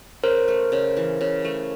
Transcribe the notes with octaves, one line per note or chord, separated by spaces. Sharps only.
C#3 A#4 C5
A3
C#3
E3
C#3
A3